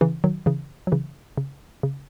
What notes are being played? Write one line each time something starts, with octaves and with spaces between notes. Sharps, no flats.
C#3 E3
D#3 F#3
C#3 E3
F#3
C#3 E3
C#3
C#3